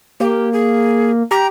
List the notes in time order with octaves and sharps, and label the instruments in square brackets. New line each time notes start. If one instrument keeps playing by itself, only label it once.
[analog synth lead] A#3 [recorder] G4
[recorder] G#4
[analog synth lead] G4 [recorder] A#5